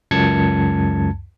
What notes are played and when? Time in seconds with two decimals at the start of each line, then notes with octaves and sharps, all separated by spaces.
0.11 C#2 F#2 A5 G#6 C#7